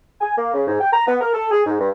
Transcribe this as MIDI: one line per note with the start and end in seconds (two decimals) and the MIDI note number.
0.21 0.33 80
0.37 0.50 58
0.54 0.64 49
0.68 0.79 44
0.80 0.90 79
0.92 1.04 82
1.07 1.16 59
1.21 1.31 70
1.34 1.47 69
1.52 1.61 68
1.66 1.77 44
1.80 1.90 43